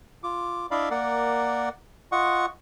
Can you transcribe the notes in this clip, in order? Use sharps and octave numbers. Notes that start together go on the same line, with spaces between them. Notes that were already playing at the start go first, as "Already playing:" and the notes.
F4 D6
D4 E4 D5 D#5 F5 B5
A#3 A#4 D5 F#5
F4 D#5 F#5 C#6